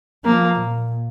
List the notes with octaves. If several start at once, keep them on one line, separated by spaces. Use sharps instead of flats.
F3 A#3
A#2